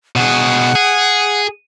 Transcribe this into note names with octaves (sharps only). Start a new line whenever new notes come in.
B2 G#4 F#5
G#4